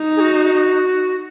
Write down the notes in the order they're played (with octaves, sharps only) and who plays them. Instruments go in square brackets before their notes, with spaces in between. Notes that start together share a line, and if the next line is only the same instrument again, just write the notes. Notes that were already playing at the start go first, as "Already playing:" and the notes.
Already playing: [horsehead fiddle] D#4
[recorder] G#4
F#4